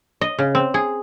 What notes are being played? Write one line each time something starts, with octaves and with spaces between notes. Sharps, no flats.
D#5
C#3
C4
G#4